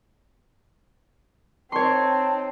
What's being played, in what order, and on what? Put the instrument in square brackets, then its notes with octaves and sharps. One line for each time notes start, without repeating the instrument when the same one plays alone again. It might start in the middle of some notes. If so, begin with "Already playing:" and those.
[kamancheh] C4 D#4 [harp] C#5 C6 [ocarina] A5